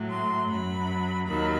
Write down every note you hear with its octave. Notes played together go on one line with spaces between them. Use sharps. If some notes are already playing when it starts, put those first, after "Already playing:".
Already playing: A2 F#3
C6
F#2 F#3 B5
D#2 D#3 F#3 B5